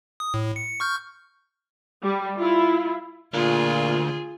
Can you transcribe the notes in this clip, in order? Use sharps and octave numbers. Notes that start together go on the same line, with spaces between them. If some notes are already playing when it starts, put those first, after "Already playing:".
D#6
A2
C#7
C#6 F6 G6
G3
E4 F4
D2 A#2 F4 G#4